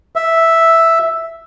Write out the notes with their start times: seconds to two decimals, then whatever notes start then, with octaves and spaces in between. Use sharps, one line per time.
0.16 E5